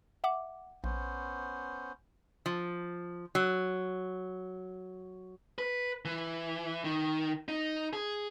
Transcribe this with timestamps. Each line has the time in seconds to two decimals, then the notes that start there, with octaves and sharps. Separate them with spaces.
0.24 E5 F#5 D6
0.84 A#1 B3 C#4 C5
2.46 F3
3.35 F#3
5.59 B4
6.05 E3
6.84 D#3
7.48 D#4
7.93 G#4